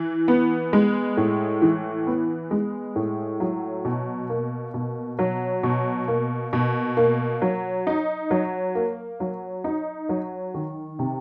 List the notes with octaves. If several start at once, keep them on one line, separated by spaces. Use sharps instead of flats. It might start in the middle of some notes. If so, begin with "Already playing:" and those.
Already playing: E3
B3
G#3
A2
E3
B3
G#3
A2
F#3
B2
A#3
B2
F#3
B2
A#3
B2
A#3
F#3
D#4
F#3
A#3
F#3
D#4
F#3
D#3
C3